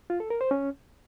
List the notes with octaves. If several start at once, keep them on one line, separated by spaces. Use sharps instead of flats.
F4
A4
A#4
C5
C#4